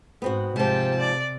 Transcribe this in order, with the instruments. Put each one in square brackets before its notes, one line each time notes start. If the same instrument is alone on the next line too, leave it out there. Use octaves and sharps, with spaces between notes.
[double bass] G#2 [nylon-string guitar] B3 C4 F#4
[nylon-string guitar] G#2 F3 [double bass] C3 [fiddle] G4 A5
[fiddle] D5